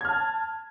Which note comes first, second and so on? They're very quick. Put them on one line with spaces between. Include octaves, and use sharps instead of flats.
G#6 F6 A5